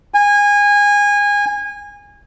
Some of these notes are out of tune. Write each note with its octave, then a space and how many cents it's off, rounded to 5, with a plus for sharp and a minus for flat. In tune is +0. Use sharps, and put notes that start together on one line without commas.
G#5 -25